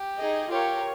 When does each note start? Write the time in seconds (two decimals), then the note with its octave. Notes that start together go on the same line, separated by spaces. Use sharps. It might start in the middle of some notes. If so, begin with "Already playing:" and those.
Already playing: G4
0.17 D#4 G#4 D#5
0.49 F4 G4 A#4 C#5